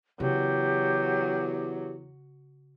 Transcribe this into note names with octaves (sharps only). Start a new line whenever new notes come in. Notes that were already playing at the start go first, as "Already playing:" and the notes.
E2 C#3 F#3 G4